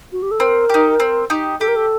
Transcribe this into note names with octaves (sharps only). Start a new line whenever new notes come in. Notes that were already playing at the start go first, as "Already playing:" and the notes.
F#4
G4
A4
C4 A#4
D#4 G4
C4
D#4 G4
G4 A4
A#4
A4